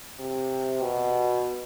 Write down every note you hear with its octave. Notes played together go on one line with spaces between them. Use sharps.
C3
B2